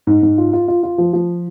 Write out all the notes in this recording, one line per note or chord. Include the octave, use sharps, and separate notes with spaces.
G#2
G#2
F4
F4
F4
F4
F3
F3